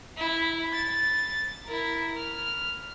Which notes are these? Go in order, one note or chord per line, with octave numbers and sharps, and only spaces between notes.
E4
A6
E4 A#4
F6